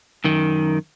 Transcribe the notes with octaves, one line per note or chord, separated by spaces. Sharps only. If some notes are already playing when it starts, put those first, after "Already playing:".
F#2 D#3